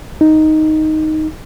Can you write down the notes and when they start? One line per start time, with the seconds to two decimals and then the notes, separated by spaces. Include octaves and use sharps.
0.21 D#4